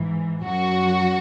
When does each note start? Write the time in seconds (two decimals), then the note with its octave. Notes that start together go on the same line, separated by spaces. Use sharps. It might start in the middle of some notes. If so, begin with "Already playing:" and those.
Already playing: G#2 E3
0.43 F#2 F#3 F#4